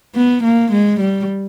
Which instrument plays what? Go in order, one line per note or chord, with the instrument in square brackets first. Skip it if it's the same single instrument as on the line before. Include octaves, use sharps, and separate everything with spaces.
[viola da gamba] B3
A#3
G#3
G3